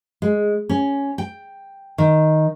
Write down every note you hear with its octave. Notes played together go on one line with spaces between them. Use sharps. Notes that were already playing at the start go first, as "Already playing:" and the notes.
G#3
C#4
G5
D#3